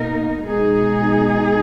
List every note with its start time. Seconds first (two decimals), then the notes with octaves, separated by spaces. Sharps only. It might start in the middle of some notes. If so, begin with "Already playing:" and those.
Already playing: B2 A#3 D#4 A#4
0.45 B2 G#3 D#4 G#4